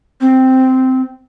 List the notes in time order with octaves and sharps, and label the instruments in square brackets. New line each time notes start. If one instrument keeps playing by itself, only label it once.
[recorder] C4